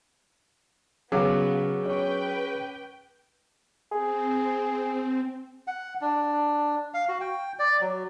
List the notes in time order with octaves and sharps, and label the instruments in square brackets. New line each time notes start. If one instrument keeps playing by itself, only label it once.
[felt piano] C#3 F5 D6 [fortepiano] F#3 [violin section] B3 [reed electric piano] G#4 F#5
[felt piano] C#4 C#6 [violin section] B4 G5
[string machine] C4 [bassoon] G#4
[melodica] F#5
D4
F5
F#4
G5
D5
F#3